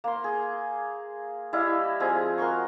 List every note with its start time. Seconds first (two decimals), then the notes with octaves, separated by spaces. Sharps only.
0.04 A#3 C6
0.24 G#4
1.53 G3 E4 D#5 F5
2.00 F3 G#3 C4 G#4
2.38 F#4 A#4 C6 C#6